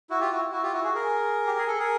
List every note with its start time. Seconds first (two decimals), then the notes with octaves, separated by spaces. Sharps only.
0.10 E4 F#4
0.20 F4 G4
0.31 E4 F#4
0.52 E4 F#4
0.63 F4 G4
0.73 E4 F#4
0.84 F#4 G#4
0.95 G#4 A#4
1.47 G4
1.58 G#4
1.68 A4
1.79 G#4 A#4